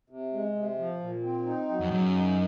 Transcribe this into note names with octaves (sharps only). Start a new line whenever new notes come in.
C3
G#3
C3
F3
A#2
C4
D#4
F#3
F2
F#2 C#3
D#4